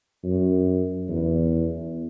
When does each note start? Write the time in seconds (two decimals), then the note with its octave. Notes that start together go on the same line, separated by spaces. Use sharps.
0.24 F#2
1.09 E2